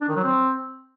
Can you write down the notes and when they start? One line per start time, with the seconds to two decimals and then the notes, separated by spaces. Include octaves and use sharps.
0.01 D4
0.09 D#3
0.16 F#3
0.23 C4